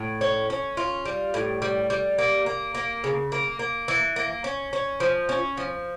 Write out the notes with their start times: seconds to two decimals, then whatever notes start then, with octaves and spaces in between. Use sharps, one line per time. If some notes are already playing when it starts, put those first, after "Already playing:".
Already playing: A2
0.21 C#4
0.50 C#4
0.77 F4
1.05 G3
1.34 A2
1.62 G3
1.90 G3
2.18 A#3
2.46 A#3
2.75 A#3
3.04 C#3
3.32 A#3
3.59 A#3
3.88 E3
4.16 A#3
4.44 C#4
4.73 C#4
5.00 F3
5.29 C#4
5.57 F3